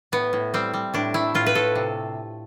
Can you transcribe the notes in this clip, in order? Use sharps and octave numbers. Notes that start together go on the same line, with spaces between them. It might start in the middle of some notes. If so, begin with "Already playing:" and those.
A2 B3
A2
G3 C4
G3
A2 D4
A3 E4
A2 F4
B4
A2 A4
C3